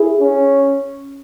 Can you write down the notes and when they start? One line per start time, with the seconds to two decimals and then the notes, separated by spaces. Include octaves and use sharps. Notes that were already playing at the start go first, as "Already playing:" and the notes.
Already playing: E4 G#4
0.19 C#4